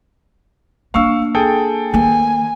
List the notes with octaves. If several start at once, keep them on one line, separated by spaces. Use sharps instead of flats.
A#3 D4 F5 C#6 E6
G#4 A4 G5
D#3 A#3 G#5